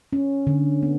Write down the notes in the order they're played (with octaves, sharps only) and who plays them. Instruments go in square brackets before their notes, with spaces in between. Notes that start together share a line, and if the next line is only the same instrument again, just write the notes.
[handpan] C#4
D3
B3